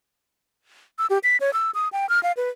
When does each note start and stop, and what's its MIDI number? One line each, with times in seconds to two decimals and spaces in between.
0.99 1.06 88
1.10 1.18 67
1.23 1.37 95
1.40 1.53 73
1.53 1.71 88
1.74 1.88 87
1.92 2.09 79
2.09 2.22 89
2.23 2.32 77
2.37 2.50 71